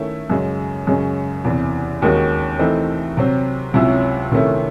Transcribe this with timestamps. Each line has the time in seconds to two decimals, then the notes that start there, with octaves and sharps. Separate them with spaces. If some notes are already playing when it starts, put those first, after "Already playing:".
Already playing: D#3 A3 C#4 E4
0.30 F#2 C#3 G#3
0.87 F#2 C#3 G#3 C#4
1.44 E2 C3 E3
2.02 D#2 D#3 G#3 C#4 F#4
2.59 E3 A3 C4 D#4
3.17 C3 F#3 C4
3.74 C#2 C3 F#3 C#4 E4
4.32 C3 D#3 A3 C#4 E4